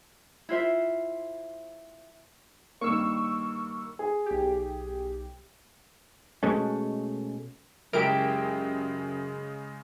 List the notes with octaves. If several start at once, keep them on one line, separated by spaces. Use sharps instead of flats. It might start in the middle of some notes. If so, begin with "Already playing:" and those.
E4 F4 C5 E5
G2 D#3 A#3 C#6 E6
G#4
B1 G4
B2 G#3 A3 C#4
F#2 C#3 G#3 E4 G4 A#4 D7